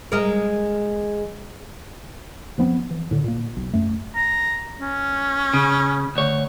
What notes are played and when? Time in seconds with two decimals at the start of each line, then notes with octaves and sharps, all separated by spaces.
0.12 G#3 A#4
2.58 F#1 F3 B3 C4
2.90 E3
3.11 A2 D3
3.24 A#2 A#3
3.57 B1
3.73 F#2 A3
4.16 A#5
4.81 C#4
5.54 C#3
6.15 D2 C#5